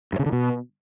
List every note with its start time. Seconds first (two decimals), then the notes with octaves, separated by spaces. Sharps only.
0.13 G2
0.19 C#3
0.26 D3
0.32 B2